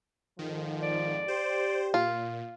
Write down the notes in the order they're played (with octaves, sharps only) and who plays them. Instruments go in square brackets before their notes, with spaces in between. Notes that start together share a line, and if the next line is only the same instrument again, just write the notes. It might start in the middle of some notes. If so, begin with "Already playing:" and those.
[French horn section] F2 G#2 F3 [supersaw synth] D#3
[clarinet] D5
[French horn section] G4 [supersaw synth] C5
[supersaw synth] A#2 [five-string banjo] F4